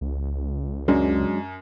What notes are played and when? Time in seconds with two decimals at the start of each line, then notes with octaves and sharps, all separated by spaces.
0.01 C#2
0.88 F#2 F#3 G#3 D4